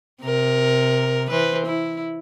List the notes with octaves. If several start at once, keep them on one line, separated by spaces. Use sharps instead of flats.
C3 A#4
E3 B4 C5
E4